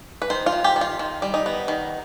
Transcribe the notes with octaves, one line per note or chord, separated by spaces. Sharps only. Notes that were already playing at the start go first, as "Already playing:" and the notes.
B4
D#3 C5
F4
D#3
G4
D#3
F4
D#3
G3
D#4
B3
D#3